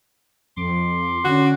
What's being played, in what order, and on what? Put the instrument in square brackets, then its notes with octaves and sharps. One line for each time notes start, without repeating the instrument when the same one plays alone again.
[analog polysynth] F2 [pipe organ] C6 D6
[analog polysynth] D3 C#4 [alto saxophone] F#4